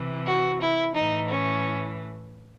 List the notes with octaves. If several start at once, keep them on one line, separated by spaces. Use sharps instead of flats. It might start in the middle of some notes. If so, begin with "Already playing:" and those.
Already playing: C3 E3
F#4
E4
A2 E3 D#4
C#4